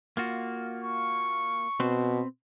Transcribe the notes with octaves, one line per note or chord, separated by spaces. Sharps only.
A#3 F4 F#4
C#6
B2 C4 B4 C5